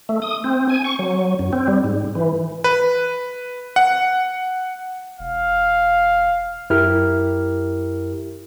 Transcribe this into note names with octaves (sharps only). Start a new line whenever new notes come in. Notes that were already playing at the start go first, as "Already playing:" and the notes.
A3
D#6
C4
G#5
C#6
F#3
F#2
C4
G3
G#2
E3
B4
F#5
E1 F5
F#2 E4 G4 A#4 F6